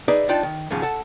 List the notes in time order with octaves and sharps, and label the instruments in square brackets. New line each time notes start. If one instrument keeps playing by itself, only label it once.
[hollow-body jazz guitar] D#4 G#4 B4 D5 E5
D4 D#4 F4 D5 G5 A5
D#3
D#2 G#2 C#3 F3
A4 F#5 A5